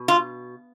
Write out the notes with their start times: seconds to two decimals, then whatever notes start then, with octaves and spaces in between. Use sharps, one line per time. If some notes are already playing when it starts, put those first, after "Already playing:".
Already playing: B2
0.08 F4